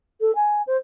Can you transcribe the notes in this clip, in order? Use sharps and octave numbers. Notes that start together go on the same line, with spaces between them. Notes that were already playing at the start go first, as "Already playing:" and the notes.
A4
G#5
C5